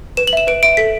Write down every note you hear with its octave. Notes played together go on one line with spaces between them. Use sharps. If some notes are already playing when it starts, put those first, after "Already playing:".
B4 E7
F#7
E5 E7
B4 D7
E5 D7
A4 B6